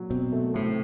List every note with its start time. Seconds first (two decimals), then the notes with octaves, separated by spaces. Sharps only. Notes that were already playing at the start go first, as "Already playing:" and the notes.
Already playing: A#2 F#3
0.10 B2 C4
0.32 A3
0.54 A2 C3